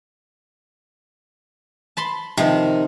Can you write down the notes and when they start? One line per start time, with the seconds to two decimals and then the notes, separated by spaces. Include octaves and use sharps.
1.97 A5 B5 C6
2.37 C3 D#3 F3